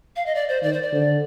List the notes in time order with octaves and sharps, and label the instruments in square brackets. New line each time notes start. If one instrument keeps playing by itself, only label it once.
[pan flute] F5
D#5
D5
C5
[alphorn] D#3 [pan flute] D5
[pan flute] C5
D5
[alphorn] D3